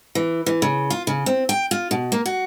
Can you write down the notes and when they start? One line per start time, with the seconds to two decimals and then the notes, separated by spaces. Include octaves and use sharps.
0.15 E3
0.46 E3
0.62 C#3
0.90 F4
1.07 C#3
1.26 C4
1.49 G5
1.71 F4
1.91 B2
2.12 A#3
2.26 F#4